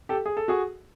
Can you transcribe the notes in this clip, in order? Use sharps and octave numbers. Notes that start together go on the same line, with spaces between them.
G4 A4
G#4
A4
F#4 G#4